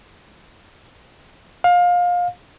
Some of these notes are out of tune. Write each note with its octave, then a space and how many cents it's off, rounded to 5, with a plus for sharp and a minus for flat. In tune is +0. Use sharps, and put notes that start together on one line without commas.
F5 +25